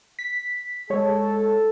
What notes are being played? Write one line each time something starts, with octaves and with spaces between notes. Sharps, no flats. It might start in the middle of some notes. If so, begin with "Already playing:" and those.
B6
G#3 A4 C#5